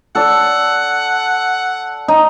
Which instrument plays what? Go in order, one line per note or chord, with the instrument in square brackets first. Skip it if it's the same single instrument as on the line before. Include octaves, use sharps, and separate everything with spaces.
[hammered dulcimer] A4 D5 [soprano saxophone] F#5
[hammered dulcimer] D#4